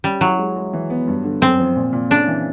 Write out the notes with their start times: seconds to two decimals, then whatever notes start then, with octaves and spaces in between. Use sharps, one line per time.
0.04 G3 C#4
0.21 F#3 E4
0.38 G#3
0.56 G#3
0.73 E3
0.90 B3
1.08 G2
1.24 D3
1.42 F#2 C4
1.59 F3
1.76 A#2
1.93 A#2
2.10 C#3 D4
2.28 E3